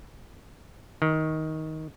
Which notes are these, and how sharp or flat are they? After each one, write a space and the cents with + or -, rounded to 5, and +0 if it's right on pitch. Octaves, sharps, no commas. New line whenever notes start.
D#3 +15